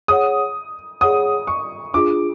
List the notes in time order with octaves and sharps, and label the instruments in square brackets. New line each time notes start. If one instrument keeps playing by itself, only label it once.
[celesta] G#4 C#5 F#5 [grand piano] D#6
[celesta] G#4 C#5 F#5 [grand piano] D#6
[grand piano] C#6
[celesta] D4 F4 G#4 [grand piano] D6